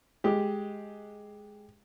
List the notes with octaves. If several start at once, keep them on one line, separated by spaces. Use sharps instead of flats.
G#3 G4